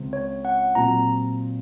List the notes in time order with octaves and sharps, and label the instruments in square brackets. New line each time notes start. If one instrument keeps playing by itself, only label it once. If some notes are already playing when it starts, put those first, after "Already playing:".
Already playing: [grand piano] C#2 C#3 G#3 C4
[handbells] C#5
F#5
[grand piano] A#2 F#3 C4 F4 [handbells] A#5